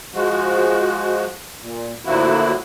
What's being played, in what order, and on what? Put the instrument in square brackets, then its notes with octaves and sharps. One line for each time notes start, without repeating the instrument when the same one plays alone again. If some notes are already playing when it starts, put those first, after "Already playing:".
[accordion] F3 G#3 F#4
A#2
A2 D3 F3 A#3 E4 F#4